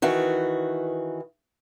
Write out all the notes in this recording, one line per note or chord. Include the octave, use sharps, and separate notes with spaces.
D#3 E3 F#4